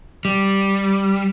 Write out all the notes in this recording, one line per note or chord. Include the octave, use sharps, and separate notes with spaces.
G3